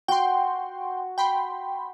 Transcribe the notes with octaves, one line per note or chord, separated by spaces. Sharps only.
F#4 G5 C6
G5 B5 C6